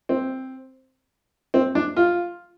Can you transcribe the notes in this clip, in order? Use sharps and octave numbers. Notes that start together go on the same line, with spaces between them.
C4
C4
D4
F4